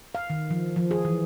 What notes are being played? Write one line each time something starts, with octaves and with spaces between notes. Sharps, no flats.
F5
D#3
F3
F3
G#4
E3